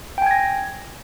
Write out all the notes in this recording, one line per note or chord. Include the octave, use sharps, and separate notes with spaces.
G5 G#5 G#6 A#6